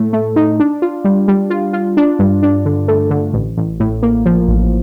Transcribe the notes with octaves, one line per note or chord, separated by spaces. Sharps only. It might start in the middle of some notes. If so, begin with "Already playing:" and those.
Already playing: A2 A3
A3
D#4
D4
F4
G3
G3
F4
F4
D4
G2
D4
D3
A3
D3
A1
A1
A2
A#3
F3
A1